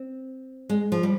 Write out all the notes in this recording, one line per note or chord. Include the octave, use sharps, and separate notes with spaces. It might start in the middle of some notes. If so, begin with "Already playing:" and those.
Already playing: C4
G#3
F3
G3